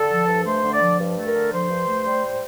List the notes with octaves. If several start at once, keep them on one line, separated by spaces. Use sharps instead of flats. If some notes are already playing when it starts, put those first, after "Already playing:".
Already playing: D3 A4
F3
G2
A3 C5
D3
D5
F3
G2
A3
A#4
D3
F3 C5
G2
A3
G3
A2